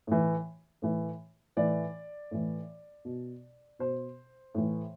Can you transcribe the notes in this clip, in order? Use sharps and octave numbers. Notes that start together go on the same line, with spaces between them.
A2 E3
A2 E3
A2 E3 D5
A2 E3
B2
B2 C5
A2 E3